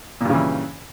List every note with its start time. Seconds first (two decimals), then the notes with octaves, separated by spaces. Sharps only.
0.21 A#2
0.25 G2
0.30 C#3
0.34 E3